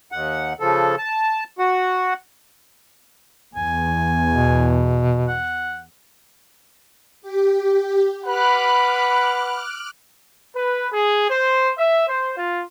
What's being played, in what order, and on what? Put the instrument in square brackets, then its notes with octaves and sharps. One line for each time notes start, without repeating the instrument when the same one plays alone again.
[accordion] D#2 F#5
C#3 F3 A4
A5
F#4 F#5
[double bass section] E2 [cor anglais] G#5
[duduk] B2
[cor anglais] F#5
[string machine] G4
[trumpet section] B4 F#5 B5 [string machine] D6 F6 F#6
[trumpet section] B4
G#4
C5
E5
C5
F4